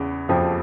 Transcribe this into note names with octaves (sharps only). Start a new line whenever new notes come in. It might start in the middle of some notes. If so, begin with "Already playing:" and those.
Already playing: E2 C#3 E3
F2 F3